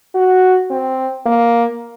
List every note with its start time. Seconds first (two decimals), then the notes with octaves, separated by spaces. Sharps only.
0.15 F#4
0.70 C4
1.26 A#3